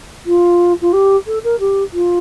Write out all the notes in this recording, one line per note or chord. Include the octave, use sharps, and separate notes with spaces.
F4
F4
G4
A4
A#4
G4
F4